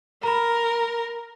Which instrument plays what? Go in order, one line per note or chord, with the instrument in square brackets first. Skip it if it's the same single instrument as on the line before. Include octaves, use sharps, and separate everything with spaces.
[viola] A#4 [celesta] A#5 B5